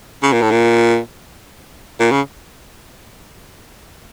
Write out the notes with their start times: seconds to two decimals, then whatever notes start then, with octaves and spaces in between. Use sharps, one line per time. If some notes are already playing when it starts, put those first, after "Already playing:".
0.23 C#3
0.33 A#2
0.42 A2
0.51 A#2
2.00 A#2
2.11 C#3